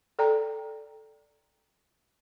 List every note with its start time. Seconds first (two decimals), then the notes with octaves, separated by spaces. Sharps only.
0.19 A4 D5 G5 A#5